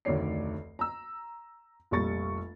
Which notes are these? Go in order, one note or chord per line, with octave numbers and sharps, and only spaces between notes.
F1 D2 D#3 C#5 D5 C7
A#5 E6
F1 A#1 G3 C#6 A6